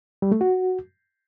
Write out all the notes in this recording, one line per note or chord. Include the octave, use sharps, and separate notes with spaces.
G3
A3
F#4